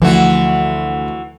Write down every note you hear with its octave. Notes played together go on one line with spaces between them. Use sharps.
D2 E3 F3 F#4